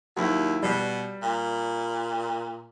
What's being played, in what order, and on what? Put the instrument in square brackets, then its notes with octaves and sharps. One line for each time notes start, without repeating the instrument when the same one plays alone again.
[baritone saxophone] D#2 [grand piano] F#3 E4
[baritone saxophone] B2 [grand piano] G3
[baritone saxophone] A#2